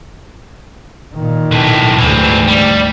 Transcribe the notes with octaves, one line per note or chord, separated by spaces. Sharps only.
A#2 D#3
B1 A2
D2 G#2 E3 C4
G3